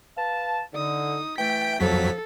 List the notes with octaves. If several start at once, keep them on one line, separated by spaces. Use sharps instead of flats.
B4 F5 A5
D3 D#4 D#6
E3 A3 G5 B6 D7
F2 F3 F#3 A4 B6